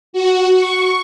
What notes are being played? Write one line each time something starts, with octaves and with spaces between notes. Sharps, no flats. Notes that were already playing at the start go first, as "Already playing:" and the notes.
F#4
C#6